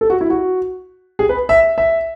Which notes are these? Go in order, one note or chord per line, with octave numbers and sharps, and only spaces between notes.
A4
F#4
E4
F#4
G#4
B4
E5
E5